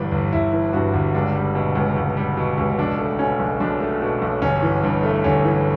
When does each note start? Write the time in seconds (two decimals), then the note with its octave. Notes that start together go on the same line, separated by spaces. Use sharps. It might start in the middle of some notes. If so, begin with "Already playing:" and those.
Already playing: G1 G2 E3 D4
0.12 G1
0.32 G1 E4
0.53 E3
0.73 G2 F#4
0.93 G1
1.15 C#2 D4
1.35 G3
1.55 B2
1.75 C#2
1.96 C#2
2.17 G3
2.37 B2
2.58 C#2
2.78 B1 D4
2.99 A3
3.19 B2 C#4
3.40 B1
3.60 B1 D4
3.80 A3
4.02 B2
4.22 B1
4.42 G1 C#4
4.62 E3
4.84 G2
5.03 A3
5.24 G1 C#4
5.44 E3